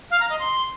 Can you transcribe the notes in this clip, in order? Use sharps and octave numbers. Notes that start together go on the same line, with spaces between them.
F5
A#5
D#5
C6